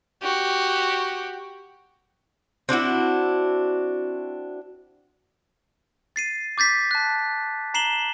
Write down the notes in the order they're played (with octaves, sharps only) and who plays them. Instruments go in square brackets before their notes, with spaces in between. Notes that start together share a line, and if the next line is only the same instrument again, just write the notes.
[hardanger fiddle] F#4 G4
[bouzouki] C4 D4 E4 F#4
[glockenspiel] A6 C7 D#7
D6 G6 A6 B6 C7
A5 F#6
A#5 C7 E7 F#7 G7